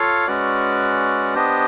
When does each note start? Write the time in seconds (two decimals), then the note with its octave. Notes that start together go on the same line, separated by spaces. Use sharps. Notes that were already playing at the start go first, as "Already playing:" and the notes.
Already playing: F4 A4 C#5 F5
0.27 G#3 C#4 F#4 B4 D5
1.35 B3 D4 G4 C5 D#5